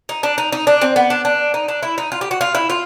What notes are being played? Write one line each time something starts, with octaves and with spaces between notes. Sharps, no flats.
D#4
D4
D#4
D#4
D4
C4
B3
D4
D4
D#4
D4
E4
D#4
F4
G4
F#4
F4
E4
F4